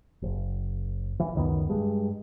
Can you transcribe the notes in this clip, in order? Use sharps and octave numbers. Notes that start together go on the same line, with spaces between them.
F#1
E3
C#2 F#2 D#3 B3
G2 G#3